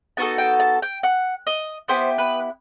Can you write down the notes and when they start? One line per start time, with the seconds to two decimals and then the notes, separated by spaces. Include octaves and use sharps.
0.17 B3 D#4 F#4 A4 A5
0.38 G5
0.60 A5
0.82 G5
1.03 F#5
1.47 D#5
1.88 B3 E4 G4 C5
2.18 B4